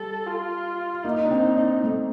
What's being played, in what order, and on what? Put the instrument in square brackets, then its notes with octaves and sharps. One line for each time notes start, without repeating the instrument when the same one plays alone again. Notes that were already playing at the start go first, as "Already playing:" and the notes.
Already playing: [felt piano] G3 [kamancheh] A4
[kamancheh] F4
[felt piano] A#3 [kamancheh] D#4
[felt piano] D4
C4
D4
A3